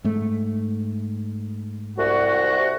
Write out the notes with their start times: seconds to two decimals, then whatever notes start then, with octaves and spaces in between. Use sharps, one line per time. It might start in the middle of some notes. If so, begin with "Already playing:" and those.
0.04 G#2 A3
1.98 C2 F#4